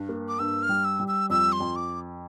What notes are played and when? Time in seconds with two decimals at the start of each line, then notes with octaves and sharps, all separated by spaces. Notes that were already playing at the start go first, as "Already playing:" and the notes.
Already playing: G2
0.09 A#3
0.28 D6
0.39 G2 E6
0.63 F6
0.69 G3
0.84 E6
1.00 G3
1.08 E6
1.30 F2 E6
1.52 C6
1.60 F2
1.76 D6